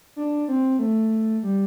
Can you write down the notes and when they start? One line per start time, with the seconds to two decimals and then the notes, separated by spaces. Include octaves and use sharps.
0.16 D4
0.48 C4
0.79 A3
1.43 G3